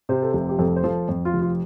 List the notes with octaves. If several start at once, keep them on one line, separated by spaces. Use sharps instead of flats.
C3 C5
A4
F1 C5
G4
F2 A4
C5
F3 A4
F2
F4
F1
F4